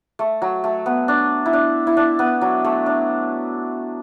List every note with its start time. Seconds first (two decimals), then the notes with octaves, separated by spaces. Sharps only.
0.19 A3
0.42 F#3
0.64 A3
0.86 B3
1.08 D4
1.46 E4
1.53 D4
1.87 E4
1.97 D4
2.19 B3
2.41 F#3
2.65 A3
2.86 D4